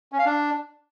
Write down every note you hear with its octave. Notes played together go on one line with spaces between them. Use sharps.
C#4
F5
D4